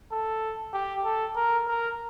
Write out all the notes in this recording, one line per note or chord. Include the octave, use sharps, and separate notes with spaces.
A4
G4
A4
A#4
A#4